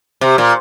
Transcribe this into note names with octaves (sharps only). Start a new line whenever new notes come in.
C3
A#2